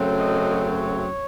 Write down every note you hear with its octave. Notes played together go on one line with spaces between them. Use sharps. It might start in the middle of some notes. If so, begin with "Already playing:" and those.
Already playing: F#2 C#3 F#3 A3 C4
D#5
C#5